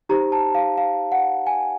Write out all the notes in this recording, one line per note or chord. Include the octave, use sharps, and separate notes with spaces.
D#4 G4 C5 A#5
A5
F5
F5
F#5
G#5